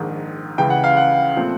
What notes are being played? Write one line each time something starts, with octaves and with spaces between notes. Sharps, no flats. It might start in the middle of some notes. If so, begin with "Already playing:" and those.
Already playing: A#1 G#2 D#3
C#2 C#3 E3 G5
F#5
F5
F#5
A#2 F3 A3 C4